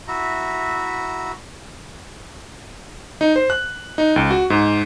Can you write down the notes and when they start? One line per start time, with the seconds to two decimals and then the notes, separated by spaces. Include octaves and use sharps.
0.08 E4 F#4 E5 A#5
3.21 D#4
3.36 C5
3.50 F#6
3.98 D#4
4.16 C#2
4.31 F#4
4.50 G#2